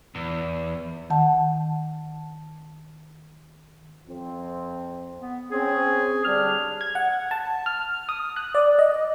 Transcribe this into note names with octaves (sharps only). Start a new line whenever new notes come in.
E2
D#3 F#5 A5
F2 C4
B3
C4 C#4 G#4
D3 G3 D4 F6
G#6
F#5
A5
F6
D#6
F#6
D5
D#5